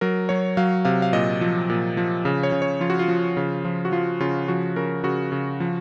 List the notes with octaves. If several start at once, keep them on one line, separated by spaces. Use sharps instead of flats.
F#3 A#4
F#3 C#5
F#3 F5
C3 F5
F5
A#2 D#5
F3
A#2
F3
C#3
C#5
C#3
C#5
F3 F4
F#4
F4
F3
C#3
F3
F#4
F3 F4
C#3 F4
F3 F#4
C#3 A#4
C#3 F#4
C#3
F3